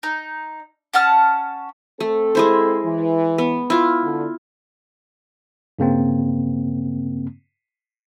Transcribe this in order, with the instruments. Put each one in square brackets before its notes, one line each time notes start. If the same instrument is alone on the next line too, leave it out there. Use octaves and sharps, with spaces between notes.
[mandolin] D#4
C#4 F#5 A5 F6
[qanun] A3 [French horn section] C4 A4
[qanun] G#3 E4 C5
[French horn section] E3
[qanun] B3
E4 F4
[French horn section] D3
[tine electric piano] G2 C#3 A#3 C4